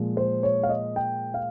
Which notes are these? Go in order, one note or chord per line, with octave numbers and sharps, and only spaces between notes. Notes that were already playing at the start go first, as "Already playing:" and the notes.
Already playing: A#2 F3 G#3
C5
C#5
F5
D#5
G5
F5